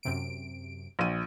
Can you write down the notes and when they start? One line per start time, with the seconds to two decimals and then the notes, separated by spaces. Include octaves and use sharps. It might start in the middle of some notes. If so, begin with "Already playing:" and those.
0.03 F#2 C3 D7
0.99 A#1 D#7